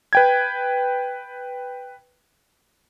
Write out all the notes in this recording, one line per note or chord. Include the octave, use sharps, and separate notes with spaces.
B4 G5 G#6